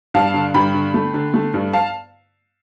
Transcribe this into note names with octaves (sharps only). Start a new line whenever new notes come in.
G2 F5 A5
D3
G2 G5 B5
D3
A3
D3
A3
G2
F5 A5